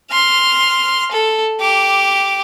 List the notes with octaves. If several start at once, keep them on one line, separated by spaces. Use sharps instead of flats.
C6 F6
A4
G4 D6